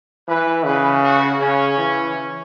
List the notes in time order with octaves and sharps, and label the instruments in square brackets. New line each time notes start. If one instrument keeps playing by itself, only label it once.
[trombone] E3 [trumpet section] B4
[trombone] C#3 [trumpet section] B4
[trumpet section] F#4
[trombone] C#3 [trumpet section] C#4
[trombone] E3